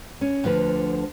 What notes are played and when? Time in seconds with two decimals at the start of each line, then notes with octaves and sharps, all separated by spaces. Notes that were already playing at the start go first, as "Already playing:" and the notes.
0.21 C#4
0.44 D2 D3 F3 B4